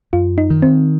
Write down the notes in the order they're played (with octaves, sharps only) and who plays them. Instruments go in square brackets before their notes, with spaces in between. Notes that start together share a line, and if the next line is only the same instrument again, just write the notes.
[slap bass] F#2 [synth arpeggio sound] F4
[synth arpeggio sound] D#4
[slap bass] D#3
[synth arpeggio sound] C4